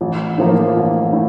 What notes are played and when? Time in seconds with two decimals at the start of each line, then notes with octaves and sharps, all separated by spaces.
0.01 A1
0.38 A2 F3 A#3 F4
0.76 A1
1.13 A2